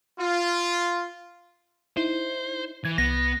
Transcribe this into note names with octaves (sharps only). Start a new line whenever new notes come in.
F4
D#4 E4 C5
E3 G#6
C2 B3 A#6